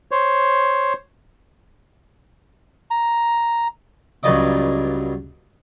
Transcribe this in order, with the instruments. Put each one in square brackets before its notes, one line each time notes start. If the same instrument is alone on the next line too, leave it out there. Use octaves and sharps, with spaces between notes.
[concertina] C5 C#5
[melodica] A#5
[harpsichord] C#2 G2 F#3 D5 D#5 D6